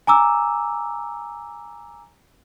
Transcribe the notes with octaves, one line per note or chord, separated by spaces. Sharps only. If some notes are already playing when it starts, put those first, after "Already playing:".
G#5 A#5 D6 E6